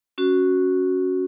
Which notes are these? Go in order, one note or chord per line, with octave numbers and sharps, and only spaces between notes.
C#4 F#4